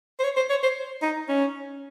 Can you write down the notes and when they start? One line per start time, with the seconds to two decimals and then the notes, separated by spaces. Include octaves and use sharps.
0.19 C5
0.24 C#5
0.36 C5
0.50 C#5
0.63 C5
1.02 D#4
1.29 C#4